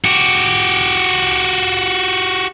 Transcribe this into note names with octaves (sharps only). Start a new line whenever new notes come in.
F#4 G4